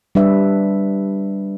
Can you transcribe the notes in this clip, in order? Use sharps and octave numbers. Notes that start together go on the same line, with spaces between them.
G3 D4 B4 E5